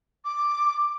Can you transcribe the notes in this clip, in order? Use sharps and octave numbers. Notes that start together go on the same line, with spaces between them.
D6